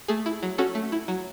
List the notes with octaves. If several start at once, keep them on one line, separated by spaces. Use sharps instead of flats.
A3 G#4
E4
F#3
C#4 F#4 A4
A3
E4
F#3